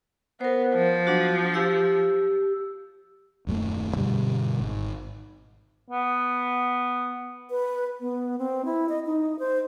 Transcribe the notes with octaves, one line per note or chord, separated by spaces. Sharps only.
B3 A#4 C5
F3
F#3 D4 F#4
G4 E6
D#1 F#2 G3 A3
G2 B2 D3 G3
G#1
B3
B4
B3
C4
E4
D#5
D#4
C5